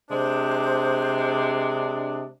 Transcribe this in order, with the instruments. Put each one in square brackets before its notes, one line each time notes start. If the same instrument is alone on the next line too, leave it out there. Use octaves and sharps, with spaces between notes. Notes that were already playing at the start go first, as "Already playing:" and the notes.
[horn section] C3 G#3 D4 [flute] C5